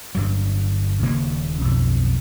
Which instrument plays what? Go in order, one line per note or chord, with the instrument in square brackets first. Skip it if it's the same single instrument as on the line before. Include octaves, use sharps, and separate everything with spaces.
[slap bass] G1 G2 F#3
D#1 C#3 A#3 C#4
B1 F2